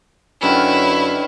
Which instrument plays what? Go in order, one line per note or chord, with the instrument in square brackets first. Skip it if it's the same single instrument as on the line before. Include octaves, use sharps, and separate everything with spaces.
[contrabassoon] F#2 [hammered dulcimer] D3 D#3 C#4 [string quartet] E4 C#5 [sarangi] B4